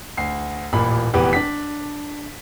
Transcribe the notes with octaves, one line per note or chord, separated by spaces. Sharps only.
D2 C7
D#1 A1 A#2 B5
F1 E2 G4 B4
D4 B6